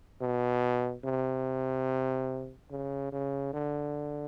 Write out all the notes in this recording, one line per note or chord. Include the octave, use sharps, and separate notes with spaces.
B2
C3
C#3
C#3
D3